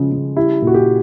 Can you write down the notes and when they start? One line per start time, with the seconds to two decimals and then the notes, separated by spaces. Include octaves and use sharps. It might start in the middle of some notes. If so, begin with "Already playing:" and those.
Already playing: C#3 F3 G#3
0.12 C#3
0.36 G3 E4
0.62 A#2
0.67 F#4
0.74 G4